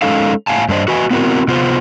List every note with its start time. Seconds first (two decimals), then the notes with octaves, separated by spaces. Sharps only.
0.02 G#3 C#4 D#4 A4 F5
0.47 A2 F5 G#5 A5
0.69 G2 A3 D4 C5 D#5
0.88 F#4 B4 D#5 G#5
1.11 B3 C4 E4 F#4 A#4
1.48 C3 B3 F4 C5